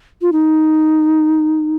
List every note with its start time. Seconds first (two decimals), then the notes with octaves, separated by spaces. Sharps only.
0.22 F4
0.32 D#4